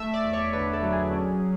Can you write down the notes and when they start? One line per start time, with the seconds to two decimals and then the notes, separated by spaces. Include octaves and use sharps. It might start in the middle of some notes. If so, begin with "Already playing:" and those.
Already playing: A3 E5
0.14 D5
0.24 E2
0.33 C#5
0.53 D3 B4
0.73 A4
0.83 F#3
0.92 G#4
1.13 C#4